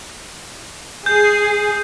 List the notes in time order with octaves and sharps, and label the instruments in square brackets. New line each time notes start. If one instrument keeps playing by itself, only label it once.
[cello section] G#4 [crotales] G6